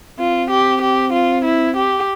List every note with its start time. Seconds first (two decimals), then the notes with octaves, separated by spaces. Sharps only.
0.19 C4 F4
0.50 G4
0.82 G4
1.13 F4
1.44 E4
1.77 G4